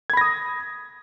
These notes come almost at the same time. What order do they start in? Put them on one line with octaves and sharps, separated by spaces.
G#6 B5 A#6 D#6